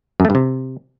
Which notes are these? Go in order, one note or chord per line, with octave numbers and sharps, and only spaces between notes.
F#2
A3
G2
C3